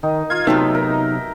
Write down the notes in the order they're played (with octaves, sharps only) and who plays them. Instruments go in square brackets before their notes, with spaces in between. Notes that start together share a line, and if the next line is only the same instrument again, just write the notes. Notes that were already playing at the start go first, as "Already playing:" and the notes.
[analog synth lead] D#3 [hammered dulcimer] D#4
[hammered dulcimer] F4 F5 [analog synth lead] G#6
[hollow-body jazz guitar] C3 F#3 B3 [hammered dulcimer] A3 E5 G5 [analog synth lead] D#4
[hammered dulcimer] A#4